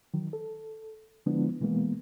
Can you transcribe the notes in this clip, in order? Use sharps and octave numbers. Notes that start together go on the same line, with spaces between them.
D#3 F#3
A4
D3 F3 G#3 B3 D4 E4
B2 E3 G#3 A#3 B3